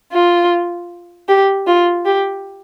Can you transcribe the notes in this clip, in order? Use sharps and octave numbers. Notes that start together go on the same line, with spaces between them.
F4
G4
F4
G4